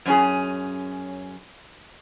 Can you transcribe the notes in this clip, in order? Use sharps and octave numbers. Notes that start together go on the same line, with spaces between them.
F#2 C#4 G#4